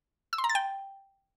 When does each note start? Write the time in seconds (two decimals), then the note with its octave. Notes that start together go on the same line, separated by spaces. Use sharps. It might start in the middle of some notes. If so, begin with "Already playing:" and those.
0.33 E6
0.38 C6
0.44 A#5
0.49 A6
0.55 G5